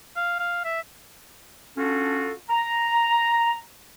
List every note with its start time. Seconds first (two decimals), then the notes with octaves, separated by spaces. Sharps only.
0.16 F5
0.40 F5
0.65 E5
1.77 C#4 D4 F4 F#4 A4
2.50 A#5